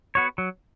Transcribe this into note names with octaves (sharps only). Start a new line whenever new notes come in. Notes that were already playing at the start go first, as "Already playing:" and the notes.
B3 F#4 C#5
F#3